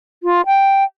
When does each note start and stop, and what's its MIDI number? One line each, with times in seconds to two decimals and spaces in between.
0.23 0.42 65
0.46 0.84 79